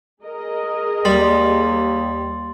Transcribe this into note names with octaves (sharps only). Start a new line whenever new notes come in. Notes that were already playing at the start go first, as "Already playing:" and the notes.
G#4 A#4 D#5
D#2 G3 C6 A6 F#7